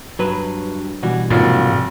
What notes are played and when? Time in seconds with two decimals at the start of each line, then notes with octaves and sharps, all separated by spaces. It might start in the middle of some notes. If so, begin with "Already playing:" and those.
0.19 G2 F#3 B4
1.03 B2 E3 G3 F#4
1.30 F1 G#2 A#3 F4 F#4